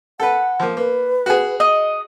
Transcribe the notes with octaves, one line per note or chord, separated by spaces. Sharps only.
A4 B4 F#5
F3 A#3
A#3 B4
F#4 G#4
D#5